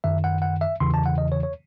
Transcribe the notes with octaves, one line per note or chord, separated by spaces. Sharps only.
F#2 D#3 E5
F#5
F#5
E5
E2 C#3 E3 C6
A5
F#5
D#5
C#5
C#5